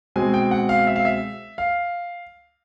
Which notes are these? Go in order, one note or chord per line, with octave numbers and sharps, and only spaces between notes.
B2 G#3 C4 G#5
G5
F#5
F5
E5
F5
E5
F5